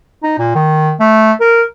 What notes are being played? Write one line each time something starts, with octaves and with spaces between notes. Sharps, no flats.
D#4
A#2
D#3
A3
A#4